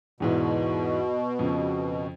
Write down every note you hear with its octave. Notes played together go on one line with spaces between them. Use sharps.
E2 G#2 B2 E3
F2 C#3